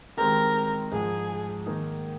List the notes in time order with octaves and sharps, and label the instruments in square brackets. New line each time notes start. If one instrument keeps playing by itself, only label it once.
[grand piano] D#3 G#3 C4 G4 [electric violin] A#4
[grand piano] G#2 F3 G#3 [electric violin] G#4
[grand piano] D#3 A#3 D#4 G#4